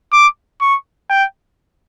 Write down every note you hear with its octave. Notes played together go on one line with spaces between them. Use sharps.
D6
C#6
G5